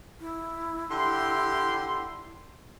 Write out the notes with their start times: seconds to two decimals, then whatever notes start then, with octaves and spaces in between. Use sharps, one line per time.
0.21 E4
0.91 D3 G4 C6